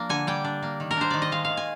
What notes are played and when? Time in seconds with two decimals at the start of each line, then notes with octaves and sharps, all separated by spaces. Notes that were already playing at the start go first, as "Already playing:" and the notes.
Already playing: F3 A#3 D4
0.09 D3 G#5
0.27 G3 G5
0.44 D4
0.62 A#3
0.80 D#3
0.91 A#4
0.97 D4 C5
1.10 D#3 D5
1.22 D#5
1.31 G#3 F5
1.45 F5
1.50 D#3
1.57 G#5